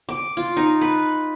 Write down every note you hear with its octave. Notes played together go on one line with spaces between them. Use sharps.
D6
F4
D#4
B4